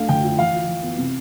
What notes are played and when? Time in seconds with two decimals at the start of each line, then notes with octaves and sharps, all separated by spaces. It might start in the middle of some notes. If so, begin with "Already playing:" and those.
Already playing: A3 D4 F5
0.09 D3 G5
0.23 F3
0.38 E3 F5
0.53 F4
0.68 E3
0.83 B3
0.97 C3